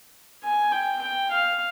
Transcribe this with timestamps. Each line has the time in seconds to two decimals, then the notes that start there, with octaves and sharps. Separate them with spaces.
0.44 G#5
0.72 G5
1.02 G5
1.31 F5